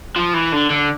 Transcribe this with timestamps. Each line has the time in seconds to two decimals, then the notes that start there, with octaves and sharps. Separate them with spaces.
0.16 F3
0.34 E3
0.52 D3
0.70 D3